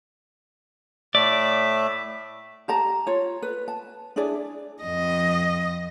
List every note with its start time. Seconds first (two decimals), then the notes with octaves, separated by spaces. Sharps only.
1.15 A2 A3 D5 E5
2.68 G4 A5 A#5
3.07 F4 C#5
3.42 B4
3.68 A5
4.16 D4 E4 G#4 D5
4.83 F2 D#5